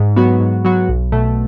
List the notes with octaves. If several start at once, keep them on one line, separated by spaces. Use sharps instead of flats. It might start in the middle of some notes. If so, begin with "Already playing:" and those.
Already playing: G#2
F#3 B3 F#4
G#2
F#3 B3 F#4
B1
B2 A3